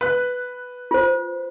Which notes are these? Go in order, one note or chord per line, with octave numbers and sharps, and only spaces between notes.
B4 F#6
F4 C5